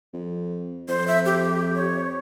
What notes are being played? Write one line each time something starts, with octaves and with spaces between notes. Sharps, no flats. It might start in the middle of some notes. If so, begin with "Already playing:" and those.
F2
F2 C5
E5
G4
C#5